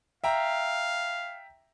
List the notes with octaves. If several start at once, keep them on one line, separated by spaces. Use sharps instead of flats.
E5 F5 G5 A#5